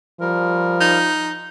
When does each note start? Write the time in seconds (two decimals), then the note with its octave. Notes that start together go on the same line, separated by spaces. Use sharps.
0.21 F3 G3 A#4
0.80 D#4